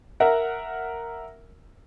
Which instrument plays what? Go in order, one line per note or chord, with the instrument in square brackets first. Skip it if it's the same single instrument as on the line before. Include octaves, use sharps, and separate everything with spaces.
[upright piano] A#4 E5 F#5